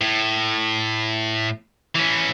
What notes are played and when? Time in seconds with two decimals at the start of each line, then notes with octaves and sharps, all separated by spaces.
0.01 A2
1.96 E3 C#4